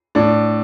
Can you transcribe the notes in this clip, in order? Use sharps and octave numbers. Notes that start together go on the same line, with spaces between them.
A2 D4